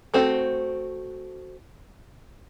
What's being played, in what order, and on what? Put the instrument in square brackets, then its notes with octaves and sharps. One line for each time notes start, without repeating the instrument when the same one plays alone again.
[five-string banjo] A3 C4 F#4 C5